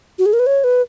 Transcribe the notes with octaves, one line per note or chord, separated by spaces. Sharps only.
F#4
G#4
A#4
B4
C#5
B4